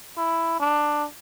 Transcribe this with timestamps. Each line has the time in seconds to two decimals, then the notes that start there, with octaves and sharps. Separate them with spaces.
0.17 E4
0.60 D4